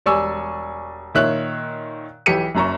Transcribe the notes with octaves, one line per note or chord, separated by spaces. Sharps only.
E1 G3 D5 G#5 C#6 E6
A#2 D#3 C#5 E5 F#6
B1 E3 G4 B6 C#7 D#7
F#1 F#2 A#5 C#6